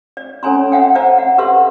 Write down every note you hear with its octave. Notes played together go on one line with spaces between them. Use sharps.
D5
C#4 A4 C#5 G#5 A#5 C6
E5 F#5 G5
C5 D5 E5 F#5 A5 A#5
F#5
G4 A4 B4 E5 F#5 C6